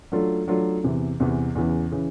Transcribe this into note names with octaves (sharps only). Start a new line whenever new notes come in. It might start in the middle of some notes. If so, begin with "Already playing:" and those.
F#3 A3 D4 F4 A4
F#3 A3 D4 F4 A4
E2 C3 E3
E2 C3 E3
E2 C#3 E3
C#3 E3